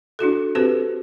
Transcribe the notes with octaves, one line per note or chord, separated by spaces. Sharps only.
D4 E4 F#4 A4
C4 F#4 G4 A4 B4 C5